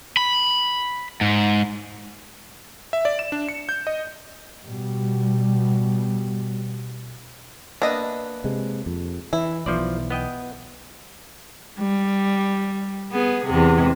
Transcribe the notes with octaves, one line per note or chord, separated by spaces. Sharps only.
B5
G#2
E5
D5
E7
D4
C#7
G6
D#5
B2 G3
A#3 B3 D4 D#5 E5
C3 G#3
F2
E3 E4
B1 E3 F3 C5 D5
B3 D#5 G5
G3
B3 G#4
E2 C3